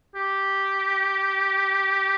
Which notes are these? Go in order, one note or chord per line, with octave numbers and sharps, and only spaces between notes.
G4